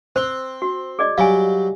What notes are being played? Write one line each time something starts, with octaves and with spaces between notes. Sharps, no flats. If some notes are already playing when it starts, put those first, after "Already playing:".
C4 C5 C6
F#4
G#4 D5 D#5
F#3 G3 F5 G#5